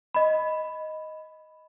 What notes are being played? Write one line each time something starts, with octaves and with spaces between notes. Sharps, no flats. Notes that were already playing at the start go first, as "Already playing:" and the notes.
D#5 B5